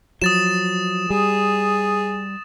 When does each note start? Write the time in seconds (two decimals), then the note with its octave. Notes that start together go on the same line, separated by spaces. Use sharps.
0.22 F3 F#3 D#6 A6 E7
1.10 G3 G#4